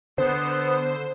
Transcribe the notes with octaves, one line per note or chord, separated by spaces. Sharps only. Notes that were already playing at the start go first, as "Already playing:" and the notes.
D3 B3 C5